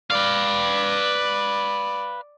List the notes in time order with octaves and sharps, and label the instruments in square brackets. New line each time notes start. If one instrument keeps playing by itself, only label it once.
[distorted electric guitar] B4 F5 [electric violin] D5